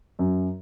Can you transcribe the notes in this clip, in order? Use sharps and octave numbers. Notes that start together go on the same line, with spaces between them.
F#2